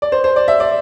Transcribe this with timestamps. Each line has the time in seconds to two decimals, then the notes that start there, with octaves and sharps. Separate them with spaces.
0.02 D5
0.12 C5
0.24 C5
0.36 D5
0.48 E5
0.60 D5